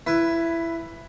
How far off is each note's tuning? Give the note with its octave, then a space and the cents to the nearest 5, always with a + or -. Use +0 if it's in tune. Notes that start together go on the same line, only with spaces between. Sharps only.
E4 +15 B4 +0